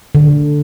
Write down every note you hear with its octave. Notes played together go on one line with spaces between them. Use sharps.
D3